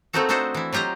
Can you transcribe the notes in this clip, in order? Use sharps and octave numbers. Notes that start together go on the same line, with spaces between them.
A3 A#3 C4 D#4 F#4 A4
D4 D#4 F#4 A4 C5 D#5
E3 E4
F#3 F4 G4 D#5 A#5